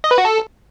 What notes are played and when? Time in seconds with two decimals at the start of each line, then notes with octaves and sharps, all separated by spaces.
0.04 D#5
0.11 B4
0.18 F#4
0.25 A4